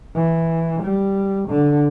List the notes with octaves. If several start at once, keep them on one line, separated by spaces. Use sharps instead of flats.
E3
G3
D3